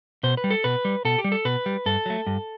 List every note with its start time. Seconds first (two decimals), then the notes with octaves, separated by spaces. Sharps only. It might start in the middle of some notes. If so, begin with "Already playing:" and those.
0.23 B2 C5
0.37 B4
0.44 G3
0.51 A4
0.64 B2 B4
0.85 G3
1.05 B2 A4
1.18 G4
1.24 G3
1.32 A4
1.45 B2 B4
1.66 G3
1.86 G2 A4
2.06 F#3 A3
2.27 G2